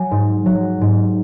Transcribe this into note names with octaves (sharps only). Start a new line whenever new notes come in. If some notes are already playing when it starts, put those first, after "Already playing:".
Already playing: F#3 G#5
G#2
F#3
G#2